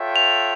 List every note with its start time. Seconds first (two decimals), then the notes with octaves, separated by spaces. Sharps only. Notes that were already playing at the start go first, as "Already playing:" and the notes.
Already playing: F4 A4 C#5 E5 G5
0.16 F7